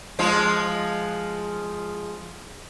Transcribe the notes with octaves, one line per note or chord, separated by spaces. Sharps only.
F3 G#3 F4